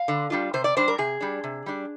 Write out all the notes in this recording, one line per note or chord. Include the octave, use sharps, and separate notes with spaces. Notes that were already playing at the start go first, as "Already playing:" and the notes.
Already playing: F5
D3
G3 D4 F4
C3 C5
D5
G3 D4 C5
A#4
C3 G#4
G3 D4
C3
G3 D4